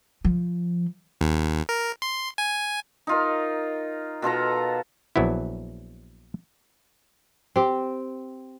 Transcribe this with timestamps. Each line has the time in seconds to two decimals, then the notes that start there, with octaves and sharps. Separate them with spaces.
0.25 F3
1.21 D#2
1.69 A#4
2.02 C6
2.38 G#5
3.07 D#4 F4 A#4
4.22 B2 F4 A4 A#5
5.16 A#1 F#3 B3 E4
7.56 C4 G4